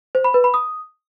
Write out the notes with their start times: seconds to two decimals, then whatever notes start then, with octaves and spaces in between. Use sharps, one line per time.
0.15 C5
0.24 B5
0.34 B4
0.44 B5
0.54 D#6